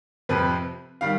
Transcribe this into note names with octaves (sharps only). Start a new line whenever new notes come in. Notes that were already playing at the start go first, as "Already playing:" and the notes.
F2 C3 F3 B4
D#3 G3 F5